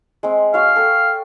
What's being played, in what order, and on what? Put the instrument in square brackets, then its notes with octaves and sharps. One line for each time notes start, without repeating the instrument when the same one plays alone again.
[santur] G#3 C4
[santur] F#4 C#5 [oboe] F5
[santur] A4 G5